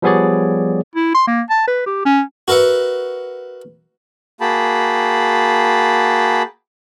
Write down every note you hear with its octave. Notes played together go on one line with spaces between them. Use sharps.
F3 G3 B3 G#4 C#5 D5
E4
C6
A#3
A5
B4
G4
C#4
F#4 A#4 B4 E5 F#5
A#3 F#4 G#4 G5 A5 B5